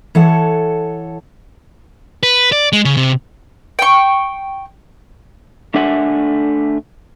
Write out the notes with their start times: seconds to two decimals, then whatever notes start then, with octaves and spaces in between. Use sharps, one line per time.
0.15 E3 A4 C#5 F#5 A5
2.23 B4
2.52 D5
2.73 G#3
2.85 C#3
2.97 C3
3.79 G5 C#6
5.74 A3 D4 A4 E5 F#5 G#5